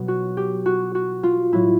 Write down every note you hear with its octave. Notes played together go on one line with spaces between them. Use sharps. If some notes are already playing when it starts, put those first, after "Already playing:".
Already playing: B2 F#3
F#4
G4
F#4
F#4
F4
A2 F#3 E4